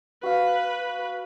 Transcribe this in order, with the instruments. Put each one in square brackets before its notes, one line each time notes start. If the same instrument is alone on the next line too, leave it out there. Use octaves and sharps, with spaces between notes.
[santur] F#4 F5 [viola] B4